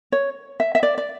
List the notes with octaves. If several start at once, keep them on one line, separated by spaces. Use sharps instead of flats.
C#5
E5
E5
D5
D5